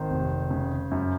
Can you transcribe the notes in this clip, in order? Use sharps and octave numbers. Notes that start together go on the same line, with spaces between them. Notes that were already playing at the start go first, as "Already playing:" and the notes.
Already playing: G#1 D#3 C5
F1
C#3
F#2